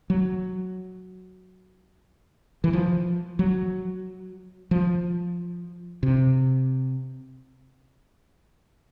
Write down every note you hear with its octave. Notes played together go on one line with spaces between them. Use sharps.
F#3
E3
F3
F#3
F3
C3